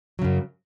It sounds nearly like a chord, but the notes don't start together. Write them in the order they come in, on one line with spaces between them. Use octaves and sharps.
F#3 C#3 F#2